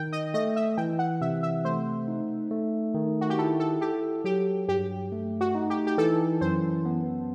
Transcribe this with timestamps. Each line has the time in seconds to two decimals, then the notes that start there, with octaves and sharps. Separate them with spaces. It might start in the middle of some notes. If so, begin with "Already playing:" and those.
Already playing: D#3 G5
0.13 D#5
0.34 A3 D#5
0.56 E5
0.78 E3 G5
0.99 F#5
1.21 C3 E5
1.43 E5
1.65 A3 C5
2.08 D#4
2.51 A3
2.94 D#3
3.21 F#4
3.30 G4
3.39 E4 A4
3.60 A4
3.81 G4 A4
4.24 F#3 G4
4.68 G2 G4
5.12 A3
5.41 F#4
5.55 D#4
5.70 G4
5.87 G4
5.98 E3 A4
6.41 F#2 C5
6.85 B3